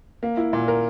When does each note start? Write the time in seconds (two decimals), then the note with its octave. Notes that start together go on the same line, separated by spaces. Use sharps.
0.23 A#3
0.37 E4
0.53 A#2
0.68 A#4